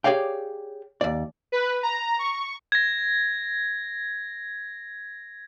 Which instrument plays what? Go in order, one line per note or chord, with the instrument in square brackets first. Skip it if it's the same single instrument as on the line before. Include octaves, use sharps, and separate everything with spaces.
[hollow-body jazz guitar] G4 G#4 C#5 D5 F5 G5
D#2 D5
[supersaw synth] B4
A#5
C#6
[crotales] G#6 A#6